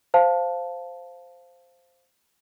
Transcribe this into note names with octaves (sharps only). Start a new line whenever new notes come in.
C5 F5 A5